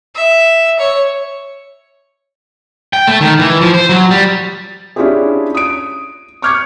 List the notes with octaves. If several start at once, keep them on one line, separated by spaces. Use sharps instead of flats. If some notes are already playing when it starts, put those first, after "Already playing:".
E5
C#5
G5
A3
D#3
E3
F3
C5
F#3
G3
C#4 D4 E4 F4 G4 G#4
D#6 D7
C#6 D6 F6 G6 G#6 C#7